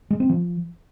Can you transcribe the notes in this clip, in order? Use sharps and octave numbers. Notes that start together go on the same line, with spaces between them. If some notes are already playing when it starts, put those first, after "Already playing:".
G#3
C4
F3